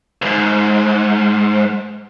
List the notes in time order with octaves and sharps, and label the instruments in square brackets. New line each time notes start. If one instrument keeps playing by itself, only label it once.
[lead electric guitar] C2 G#2